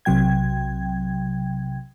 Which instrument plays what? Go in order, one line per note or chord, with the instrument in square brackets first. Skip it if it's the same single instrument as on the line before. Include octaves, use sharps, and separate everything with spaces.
[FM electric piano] B1 C3 F#3 G5 G#6